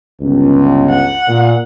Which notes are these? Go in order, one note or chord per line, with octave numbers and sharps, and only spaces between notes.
G1 C#2
F#5
A#2